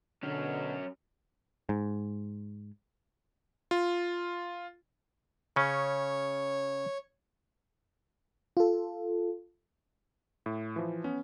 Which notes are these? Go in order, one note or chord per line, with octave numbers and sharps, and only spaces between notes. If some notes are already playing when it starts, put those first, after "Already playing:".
B2 D3 F#3 C#4
G#2
F4
C#3 C#4 C#5
F4 A4
A2
E3 F3
B3 C#4